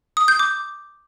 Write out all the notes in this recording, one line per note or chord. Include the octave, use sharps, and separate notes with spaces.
D#6
G6
D6